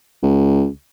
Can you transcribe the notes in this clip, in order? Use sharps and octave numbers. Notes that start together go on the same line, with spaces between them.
C#2